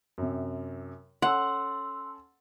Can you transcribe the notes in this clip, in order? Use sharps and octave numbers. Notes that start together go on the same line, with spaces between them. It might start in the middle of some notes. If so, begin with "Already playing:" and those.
F#2 C3
C#4 A4 F#5 C6 E6